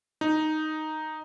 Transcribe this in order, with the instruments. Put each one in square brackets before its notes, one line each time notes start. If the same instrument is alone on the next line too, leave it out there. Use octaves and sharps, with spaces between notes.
[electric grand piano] D#4